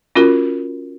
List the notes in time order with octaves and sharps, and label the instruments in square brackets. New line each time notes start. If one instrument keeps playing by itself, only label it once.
[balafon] C#4 F4 F#4 A#4